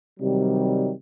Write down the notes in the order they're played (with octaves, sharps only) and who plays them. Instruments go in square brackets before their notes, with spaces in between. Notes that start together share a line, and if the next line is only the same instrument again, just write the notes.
[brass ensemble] C3 D#3 F#3 G3